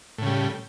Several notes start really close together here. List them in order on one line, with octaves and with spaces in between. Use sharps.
A2 C#3 G3